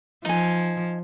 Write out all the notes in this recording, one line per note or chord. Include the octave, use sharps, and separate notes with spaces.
F3 D#4 G#5